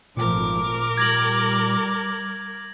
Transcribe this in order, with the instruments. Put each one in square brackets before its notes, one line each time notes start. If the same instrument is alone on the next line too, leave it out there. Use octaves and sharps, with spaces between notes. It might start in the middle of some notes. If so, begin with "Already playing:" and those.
[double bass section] G#1 F3 A3 [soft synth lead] A#2 [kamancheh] A#4 D6
[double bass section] G3 [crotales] G#6 A#6 F#7